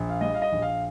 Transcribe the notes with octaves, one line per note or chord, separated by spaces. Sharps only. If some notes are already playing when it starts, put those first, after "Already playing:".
Already playing: A#1
F5
G3 D#5
F5
D#5
A#1
F5